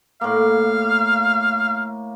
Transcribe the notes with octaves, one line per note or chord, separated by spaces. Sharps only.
A2 A#3 F5